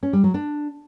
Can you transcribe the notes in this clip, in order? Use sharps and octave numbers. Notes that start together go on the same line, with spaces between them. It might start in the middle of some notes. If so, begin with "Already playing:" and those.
C#4
G3
F#3
D4